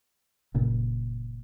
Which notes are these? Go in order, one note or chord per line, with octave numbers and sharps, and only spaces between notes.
F#1 A#2 C#3